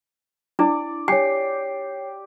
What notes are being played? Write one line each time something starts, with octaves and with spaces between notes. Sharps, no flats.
D4 E4 D5
G4 C#5 G#5 C7